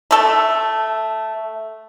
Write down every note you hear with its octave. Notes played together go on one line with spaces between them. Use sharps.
A3 A4